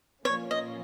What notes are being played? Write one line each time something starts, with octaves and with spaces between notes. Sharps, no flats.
A#2 F3 A#3 C#4 F4 C#5
D#5